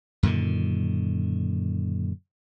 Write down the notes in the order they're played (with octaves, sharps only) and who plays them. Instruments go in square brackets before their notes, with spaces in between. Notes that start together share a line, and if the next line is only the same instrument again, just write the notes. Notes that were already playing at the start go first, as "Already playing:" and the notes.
[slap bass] F#2 A#2 D3 D#3